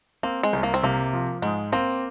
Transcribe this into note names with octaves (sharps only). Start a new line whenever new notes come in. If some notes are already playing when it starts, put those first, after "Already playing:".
A#3 C4
G#3
C2
A#3
C4
C3 A#3
F3
G#2 G#3
A#3 C4